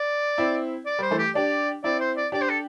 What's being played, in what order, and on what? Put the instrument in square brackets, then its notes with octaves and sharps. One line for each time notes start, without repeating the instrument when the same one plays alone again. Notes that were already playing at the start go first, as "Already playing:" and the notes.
Already playing: [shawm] D5
[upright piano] C4 E4
[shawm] D5
[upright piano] G3
[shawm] C5
[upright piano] E3 A3
[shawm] G4
[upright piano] D4 G4 [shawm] D5
[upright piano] C4 E4 [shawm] D5
[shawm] C5
D5
[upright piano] D4 G4 [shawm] D5
[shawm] C5
A4